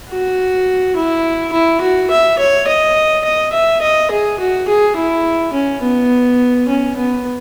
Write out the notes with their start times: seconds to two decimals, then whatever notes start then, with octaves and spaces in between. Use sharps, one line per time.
0.10 F#4
0.97 E4
1.53 E4
1.81 F#4
2.11 E5
2.39 C#5
2.67 D#5
3.25 D#5
3.53 E5
3.82 D#5
4.11 G#4
4.40 F#4
4.68 G#4
4.96 E4
5.53 C#4
5.82 B3
6.68 C#4
6.97 B3